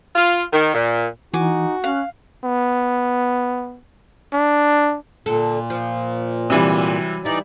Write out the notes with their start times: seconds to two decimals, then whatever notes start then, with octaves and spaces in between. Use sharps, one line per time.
0.15 F4
0.52 D#3
0.74 A#2
1.34 E3 D#4 F#4 G#5 D6
1.84 C#4 F5 F#6
2.44 B3
4.33 D4
5.26 A#2 D3 A4
5.70 F3
6.50 C3 E3 F#3 G3
7.25 E3 G3 D#4 E4 D5